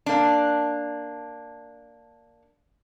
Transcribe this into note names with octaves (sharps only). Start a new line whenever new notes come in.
A#3 D4